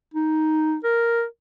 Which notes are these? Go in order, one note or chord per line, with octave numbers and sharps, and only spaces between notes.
D#4
A#4